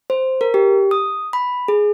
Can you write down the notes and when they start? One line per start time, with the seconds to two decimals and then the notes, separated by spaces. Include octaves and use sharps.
0.10 C5
0.41 A#4
0.54 G4
0.91 D#6
1.33 B5
1.68 G#4